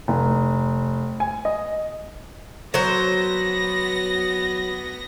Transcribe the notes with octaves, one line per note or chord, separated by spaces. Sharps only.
F1
G#5
D#5
F#3 B3 C5 A#6